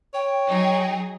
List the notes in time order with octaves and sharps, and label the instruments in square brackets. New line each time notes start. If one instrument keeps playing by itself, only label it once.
[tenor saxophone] C#5 [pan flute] G5
[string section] F#3 D#4 G#4